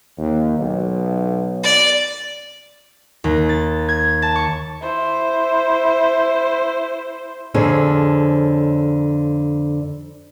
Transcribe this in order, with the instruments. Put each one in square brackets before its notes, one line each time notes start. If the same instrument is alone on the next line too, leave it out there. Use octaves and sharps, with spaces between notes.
[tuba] D#2
B1
[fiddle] D5
[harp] D#2
A6
G#6
A5
C#6
[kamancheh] E4 C5
[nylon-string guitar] F2 D3 C4 G#4 C#5